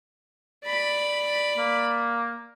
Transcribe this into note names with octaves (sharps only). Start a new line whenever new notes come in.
D5 B5
A#3